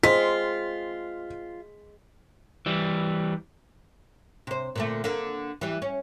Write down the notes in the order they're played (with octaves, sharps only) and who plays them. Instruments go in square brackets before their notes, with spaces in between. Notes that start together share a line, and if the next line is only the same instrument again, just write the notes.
[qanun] G#3 [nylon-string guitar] C4 [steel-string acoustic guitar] F4 [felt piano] B6
[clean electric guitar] E3 G3
[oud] C3 C5
A#2 D3 A3
D3 A#3
E3 G3
C#4